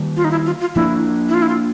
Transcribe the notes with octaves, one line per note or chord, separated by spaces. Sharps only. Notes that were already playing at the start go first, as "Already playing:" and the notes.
Already playing: D#3 G3 A#3
F4
D#4
E4
F4
F4
F3 A#3 D4 E4
E4
F4
E4
F4